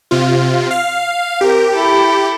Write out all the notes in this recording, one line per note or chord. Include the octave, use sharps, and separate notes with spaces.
C3 F4
F5
C4 G4 A#4
E4 A4